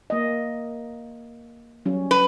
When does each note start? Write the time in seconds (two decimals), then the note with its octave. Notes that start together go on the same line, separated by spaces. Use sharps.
0.10 A#3 D#5
1.86 F#3 G3 C#4
2.11 B4